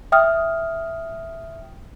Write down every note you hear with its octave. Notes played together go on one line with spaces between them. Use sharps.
E5 G5 D#6 F6